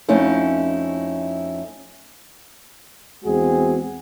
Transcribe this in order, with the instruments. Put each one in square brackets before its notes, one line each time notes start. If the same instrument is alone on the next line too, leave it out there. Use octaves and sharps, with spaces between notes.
[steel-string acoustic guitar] F2 A3 C#4 D#4 E4
[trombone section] E2 G#3 C4 F#4 G#4